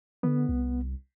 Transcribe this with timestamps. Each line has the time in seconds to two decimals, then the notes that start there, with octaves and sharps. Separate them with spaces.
0.23 D3 B3
0.49 C2